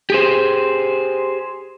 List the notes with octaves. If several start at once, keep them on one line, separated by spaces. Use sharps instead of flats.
G4 G#4 C5